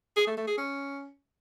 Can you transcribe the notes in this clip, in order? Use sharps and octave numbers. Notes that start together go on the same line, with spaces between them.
G#4
A3
A3
G#4
C#4